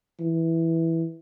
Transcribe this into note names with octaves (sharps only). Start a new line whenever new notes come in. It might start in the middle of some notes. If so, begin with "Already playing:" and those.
E3